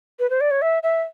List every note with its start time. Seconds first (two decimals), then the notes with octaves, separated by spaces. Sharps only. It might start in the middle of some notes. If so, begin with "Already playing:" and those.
0.20 B4
0.30 C5
0.41 D5
0.51 C#5
0.62 E5
0.83 E5